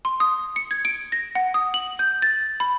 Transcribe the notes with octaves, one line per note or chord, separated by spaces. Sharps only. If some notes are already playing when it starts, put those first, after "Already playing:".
C6
D#6
C#7
G#6
D7
A#6
F#5
D#6
F#7
G6
A6
B5